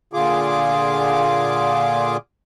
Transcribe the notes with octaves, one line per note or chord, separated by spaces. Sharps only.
A#2 D3 F4 G#4 D6